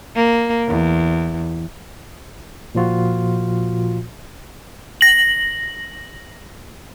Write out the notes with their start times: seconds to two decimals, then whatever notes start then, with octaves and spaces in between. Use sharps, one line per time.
0.16 A#3
0.68 E2
2.75 A#2 F3 F4 F#4
5.01 A#6 F#7